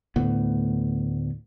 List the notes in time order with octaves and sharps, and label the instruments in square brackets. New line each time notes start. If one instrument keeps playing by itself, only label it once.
[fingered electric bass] D2 A2 B3